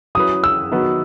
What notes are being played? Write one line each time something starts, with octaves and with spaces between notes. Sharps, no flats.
F#3 C#4 E4 B4 D#6
E6
D#3 F#3 B3 F#4 B4